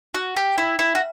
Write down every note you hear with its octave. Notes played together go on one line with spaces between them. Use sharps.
F#4
G4
E4
E4
F#4